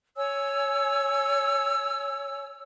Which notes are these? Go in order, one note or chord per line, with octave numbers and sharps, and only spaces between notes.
C#5 G#5 E6